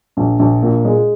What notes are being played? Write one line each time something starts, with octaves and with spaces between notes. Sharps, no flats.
A#1
A#1
A#2
G#3